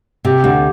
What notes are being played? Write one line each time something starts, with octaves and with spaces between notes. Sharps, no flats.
C3 G4
D2 G4